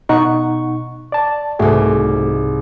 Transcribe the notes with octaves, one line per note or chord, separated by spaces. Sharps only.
B2 D#4 F#5 C#6
D5 A5
C2 G#2 A3 F#4 G#4